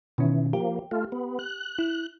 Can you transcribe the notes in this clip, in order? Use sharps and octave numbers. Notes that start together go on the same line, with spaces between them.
B2 D#3 E3 C#4
F3 A#3 G4
A3 F4
B3
F#6
E4